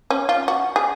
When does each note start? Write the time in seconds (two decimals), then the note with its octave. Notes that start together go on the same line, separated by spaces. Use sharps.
0.10 C#4
0.29 F4
0.48 F#4
0.76 G#4